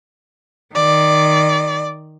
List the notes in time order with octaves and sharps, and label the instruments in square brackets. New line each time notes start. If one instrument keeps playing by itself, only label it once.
[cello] D#3 [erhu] D5